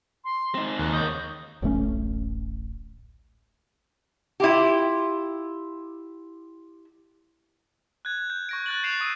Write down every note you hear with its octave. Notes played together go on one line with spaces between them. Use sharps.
C6
C4 D#4
D#2 F#6
C#5 D#5 G6
D1 A1 A3 C#4
E4 F4 G4
F#6 G#6
G6
C#6 A#6 D7
F#6 A6 F#7
G6 A6 C7 D7 E7 F7
C#6 D#6 E6 F#6 D#7